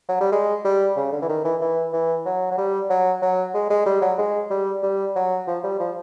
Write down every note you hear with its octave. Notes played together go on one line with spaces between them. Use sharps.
F#3
G3
G#3
G3
C#3
D3
E3
D#3
E3
E3
E3
F#3
F#3
G3
F#3
F#3
G#3
G#3
G3
F#3
G#3
G3
G3
F#3
F3
G3
F3